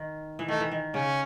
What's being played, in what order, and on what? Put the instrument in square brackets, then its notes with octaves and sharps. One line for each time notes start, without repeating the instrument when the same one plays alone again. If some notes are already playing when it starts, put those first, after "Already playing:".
Already playing: [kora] D#3
E3
[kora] D#3 [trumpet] A3
[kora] E3
D#3
[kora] C#3 [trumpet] C#4